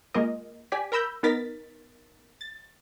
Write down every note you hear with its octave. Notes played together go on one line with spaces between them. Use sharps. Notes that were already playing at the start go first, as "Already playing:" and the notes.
G#3 A#3 F4 A#4 D#5
G4 D5 G#5 B6
A#4 A#5 B5 E6 G6
B3 D#4 A#4 A6 B6
A6